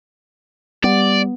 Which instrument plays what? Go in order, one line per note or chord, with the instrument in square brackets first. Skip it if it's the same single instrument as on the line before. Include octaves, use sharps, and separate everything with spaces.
[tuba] G3 [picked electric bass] B3 [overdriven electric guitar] D5